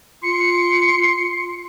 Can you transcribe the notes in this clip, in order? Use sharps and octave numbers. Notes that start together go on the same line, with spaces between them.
F4 C6 C#7